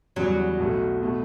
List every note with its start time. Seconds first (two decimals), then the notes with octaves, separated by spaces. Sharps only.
0.16 E2 C#3 F#3 G3
0.58 B1 B2 A3
1.02 B2 A3